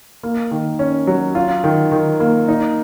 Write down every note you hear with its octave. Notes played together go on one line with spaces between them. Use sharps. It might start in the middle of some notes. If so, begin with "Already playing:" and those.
A#3
D#3
C#4
F#3
F4
D#3
D#3
A#3
D#4